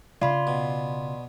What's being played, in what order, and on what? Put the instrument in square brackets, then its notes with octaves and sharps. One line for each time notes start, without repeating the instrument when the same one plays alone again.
[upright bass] C#3 [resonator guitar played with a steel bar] F4 [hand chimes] D5 B5 C6
[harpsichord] B2